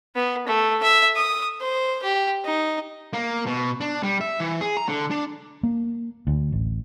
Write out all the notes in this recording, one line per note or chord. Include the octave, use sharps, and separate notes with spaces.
B3
A3
E5
D#6
C5
G4
D#4
A#3
B2
D4
G3
E5
E3
G#4
A#5
D3
D4
A#3
D2
A1